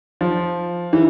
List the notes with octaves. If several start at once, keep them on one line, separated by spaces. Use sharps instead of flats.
F3
E3